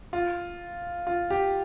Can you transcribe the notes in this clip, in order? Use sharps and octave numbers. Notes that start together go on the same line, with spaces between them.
F4
F4
G4